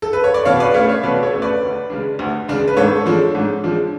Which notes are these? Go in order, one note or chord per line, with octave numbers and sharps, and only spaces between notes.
A4
B4
C#5
D5
B2 C#5 F5
B4 D5
A3 C#4 C#5 F5
C#5 F5
B2 B4 D5
A4 C#5
A3 C#4
B4 D5
D2
C#3 G#3 D4
D2
C#3 G#3 D4
B4
G#2 A4 C#5
F3 G#3 D4
G#2
F3 G#3 D4